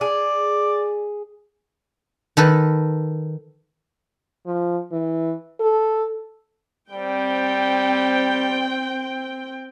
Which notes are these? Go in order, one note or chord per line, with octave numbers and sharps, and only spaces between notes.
G#4 D5
D#3 A4 B4
F3
E3
A4
G3 C4 G5